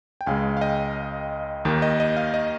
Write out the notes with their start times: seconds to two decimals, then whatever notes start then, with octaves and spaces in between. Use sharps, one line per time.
0.21 G5
0.26 C#2 C#3 G#3 F5 G#5
0.57 F5
0.61 D#5 G5
1.65 D#2 D#3 A#3
1.82 D#5
2.00 D#5
2.16 F5
2.34 D#5